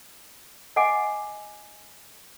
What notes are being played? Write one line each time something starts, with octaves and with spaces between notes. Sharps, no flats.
D#5 F#5 G#5 D6